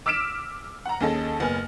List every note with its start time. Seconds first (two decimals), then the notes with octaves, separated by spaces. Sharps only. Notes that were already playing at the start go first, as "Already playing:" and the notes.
0.06 D6 E6 F6 B6 D7 E7
0.85 F#5 A#5
1.00 D#2 C#4 G#4 A4 D#5 A5
1.40 F#1 B3 G#5 F6